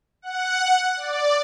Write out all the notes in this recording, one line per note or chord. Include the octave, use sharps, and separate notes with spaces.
F#5
D5